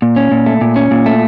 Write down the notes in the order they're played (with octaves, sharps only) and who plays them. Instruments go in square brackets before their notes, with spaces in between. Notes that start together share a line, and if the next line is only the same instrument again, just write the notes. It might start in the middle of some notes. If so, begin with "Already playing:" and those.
[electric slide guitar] A#2
C#4
A#2
A3
A#2
C#4
A#2
A3